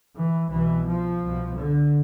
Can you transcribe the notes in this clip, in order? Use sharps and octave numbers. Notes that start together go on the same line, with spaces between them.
E3
C2 B2 E3
F3
C2 B2
D3